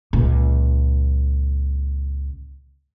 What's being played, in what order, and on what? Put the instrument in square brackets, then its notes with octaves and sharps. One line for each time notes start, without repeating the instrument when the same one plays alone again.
[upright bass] C#2 A#2